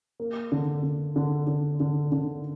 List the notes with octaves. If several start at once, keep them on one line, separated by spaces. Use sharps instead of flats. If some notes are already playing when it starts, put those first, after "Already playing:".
A#3
D3
D3
D3
D3
D3
D3